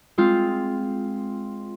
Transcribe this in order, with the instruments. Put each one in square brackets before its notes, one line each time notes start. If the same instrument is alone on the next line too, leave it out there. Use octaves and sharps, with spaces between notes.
[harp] G#3 C4 F4